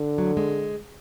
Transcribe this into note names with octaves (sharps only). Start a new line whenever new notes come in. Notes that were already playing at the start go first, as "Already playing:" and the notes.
Already playing: D3
F#3
G#3